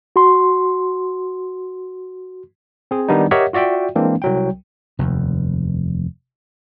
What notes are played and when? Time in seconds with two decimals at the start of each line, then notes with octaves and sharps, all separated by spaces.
0.16 F#4 C6
2.91 C4 G#4
3.08 D#3 G3 B3 D4 D#4
3.31 G4 A#4 C#5 D#5 E5 F#5
3.53 F4 F#4 D5 E5 G5
3.96 E3 G#3 A#3 C4 D4
4.22 C2 F#3 G5
4.99 F1 D#2